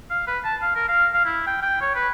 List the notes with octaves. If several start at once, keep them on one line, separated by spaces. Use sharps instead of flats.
F5
B4
A5
F5
A#4
F5
F5
E4
G5
G5
C#5
B4